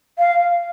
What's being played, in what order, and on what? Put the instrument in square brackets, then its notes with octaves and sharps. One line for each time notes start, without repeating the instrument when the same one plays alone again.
[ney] F5